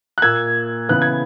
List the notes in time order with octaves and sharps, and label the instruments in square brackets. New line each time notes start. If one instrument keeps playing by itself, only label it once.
[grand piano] F#6
A#2 A#3 E6 G#6
C#3 E3 B3 F#6
G#6